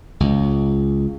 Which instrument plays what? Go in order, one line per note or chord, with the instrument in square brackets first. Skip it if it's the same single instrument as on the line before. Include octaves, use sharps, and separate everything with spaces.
[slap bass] C#2